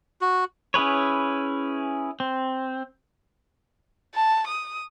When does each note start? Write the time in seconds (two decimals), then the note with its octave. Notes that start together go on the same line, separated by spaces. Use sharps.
0.21 F#4
0.74 C#4 E4 G#4 B4 C#5
2.20 C4
4.15 A5
4.47 D#6